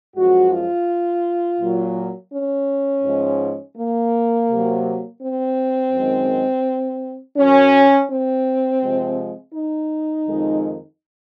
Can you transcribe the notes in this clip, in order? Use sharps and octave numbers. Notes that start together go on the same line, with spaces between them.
F#2 F3 G#3 F#4
F4
A#2 F#3
C#4
G#2 F3 G#3
A#3
C3 F#3
C4
F#2 D#3 G#3
F#2 D#3 F#3 C#4
C4
C3 F3 G#3
D#4
F2 D#3 G#3